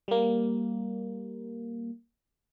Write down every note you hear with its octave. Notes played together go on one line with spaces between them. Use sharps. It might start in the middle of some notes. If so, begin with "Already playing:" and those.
G3 A#3